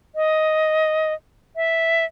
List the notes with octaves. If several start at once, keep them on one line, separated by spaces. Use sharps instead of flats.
D#5
E5